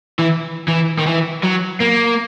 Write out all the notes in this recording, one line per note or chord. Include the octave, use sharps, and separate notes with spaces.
E3
E3
D#3
E3
F#3
A#3